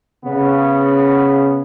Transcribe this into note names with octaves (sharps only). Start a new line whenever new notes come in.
C#3 B3